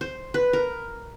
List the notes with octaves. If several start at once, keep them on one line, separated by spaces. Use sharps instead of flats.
C5
B4
A#4